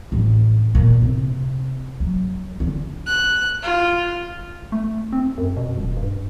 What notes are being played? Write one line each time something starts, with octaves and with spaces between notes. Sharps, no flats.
A1
A#2
C3
F#3
D3
F#6
F4
A3
C4
F#2
B2
D#1
G2